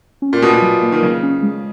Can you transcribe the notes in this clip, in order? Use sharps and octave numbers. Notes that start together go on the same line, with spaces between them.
C#4
A#2
B2 F#4
B2
F#3
A#3
D#3
C#3 F#3
C#4
G#3